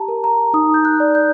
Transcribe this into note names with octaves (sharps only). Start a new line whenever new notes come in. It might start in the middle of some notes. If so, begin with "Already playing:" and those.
Already playing: G4 A5 A#5
A#4
A#5
D#4 D#6
G6
F#6
D5
G6